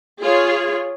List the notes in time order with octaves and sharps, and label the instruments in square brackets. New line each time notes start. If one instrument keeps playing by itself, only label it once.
[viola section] F4 G#4 C#5